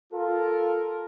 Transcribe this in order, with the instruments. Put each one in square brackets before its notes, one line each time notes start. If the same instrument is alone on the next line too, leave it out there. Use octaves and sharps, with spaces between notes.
[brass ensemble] F4 A4 A#4